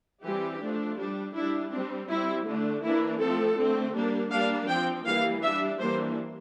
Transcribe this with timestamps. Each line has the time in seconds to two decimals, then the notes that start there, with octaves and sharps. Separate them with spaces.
0.23 E3 G3 C4 G4
0.60 F3 A3 D4
0.97 G3 D4
1.34 G3 D4 E4
1.71 G3 C4 D4
2.08 G3 C4 E4
2.45 D3 A3 D4
2.82 E3 A#3 D4 E4
3.19 F3 A3 C4 A4
3.57 D3 A3 C4
3.94 G3 A#3 D4
4.31 G3 A#3 D4 F5
4.68 F3 C4 G5
5.05 E3 G3 A#3 F5
5.42 G3 D4 E5
5.79 E3 G3 A#3 D4 C5